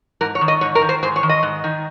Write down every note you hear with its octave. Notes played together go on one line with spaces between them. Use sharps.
G#2 A#4
C#5
D#3
D#5
G#2 C#5
A#4
D#3
C5
G#2 C5
C#5
D#3
D#5
G#2
D#3